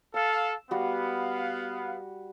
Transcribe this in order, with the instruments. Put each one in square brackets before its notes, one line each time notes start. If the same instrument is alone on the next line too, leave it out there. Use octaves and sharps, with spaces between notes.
[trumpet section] A4 F5 [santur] E6
[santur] G3 F#4 [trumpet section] B3 F5